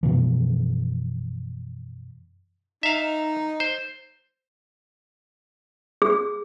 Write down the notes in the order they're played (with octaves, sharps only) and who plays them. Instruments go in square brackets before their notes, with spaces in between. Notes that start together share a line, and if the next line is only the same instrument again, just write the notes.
[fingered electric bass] F#2 B2 E3 F3
[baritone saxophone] D#4 [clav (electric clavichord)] E5 F5
[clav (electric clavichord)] C5
[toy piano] G#4